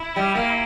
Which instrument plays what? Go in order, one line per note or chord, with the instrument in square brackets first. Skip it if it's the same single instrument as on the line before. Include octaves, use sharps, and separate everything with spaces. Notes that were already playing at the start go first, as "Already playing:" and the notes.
Already playing: [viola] E4
[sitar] G3
A#3